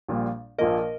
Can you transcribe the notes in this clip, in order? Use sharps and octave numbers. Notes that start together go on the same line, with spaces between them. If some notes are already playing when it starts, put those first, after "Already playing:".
A#1 A#2 G3
A#1 A#2 F3 A#3 A#4 D#5